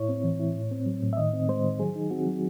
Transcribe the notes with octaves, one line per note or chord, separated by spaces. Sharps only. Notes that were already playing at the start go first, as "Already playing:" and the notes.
Already playing: A2 E4 C#5
C4
E3
E4
A2
C4
F#3
A2
E5
D#3 D#5
C4
G#3 C5
D#3
F#3 G#4
D#4
C4 F#4
F#3